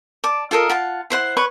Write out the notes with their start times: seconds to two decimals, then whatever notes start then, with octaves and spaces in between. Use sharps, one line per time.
0.24 D5 A5 D6
0.51 F4 A4 A#4 D#5
0.69 F4 F#5 A5
1.10 E4 C5 F#5
1.37 B4 C#5 C#6